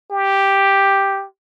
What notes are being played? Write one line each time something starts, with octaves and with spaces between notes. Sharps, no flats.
G4